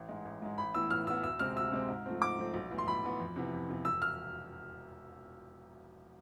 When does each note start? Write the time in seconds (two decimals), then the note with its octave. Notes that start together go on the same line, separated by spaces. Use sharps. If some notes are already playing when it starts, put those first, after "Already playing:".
Already playing: A1
0.09 G#2 G#3
0.25 A1
0.42 G#2 G#3
0.57 A1 B5
0.74 A2 E3 B3 E6
0.90 A1 F6
1.07 A2 E3 B3 E6
1.23 D2 E6
1.39 C3 G#3 C4 F6
1.56 D2 E6
1.72 C3 G#3 C4
1.89 G#2
2.06 F3 A3 C4
2.21 G#2 D6
2.38 F3 A3 C4
2.54 B1
2.71 A2 E3 B3
2.78 C6
2.87 B1 B5
3.04 A2 E3 B3
3.20 F2
3.36 C3 E3 B3
3.53 F2
3.69 C3 E3 B3
3.85 E1 E6
4.02 F6